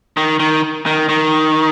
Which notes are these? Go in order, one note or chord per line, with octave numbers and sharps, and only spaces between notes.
D#3
D#3
D#3
D#3